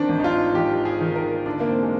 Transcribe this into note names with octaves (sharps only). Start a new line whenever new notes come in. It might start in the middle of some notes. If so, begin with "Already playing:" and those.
Already playing: D#3 C4 D4
G#1
D#4
F4
G#1 G4
G#4
D#3
A#4
D3 D4
A#3
C4
G#3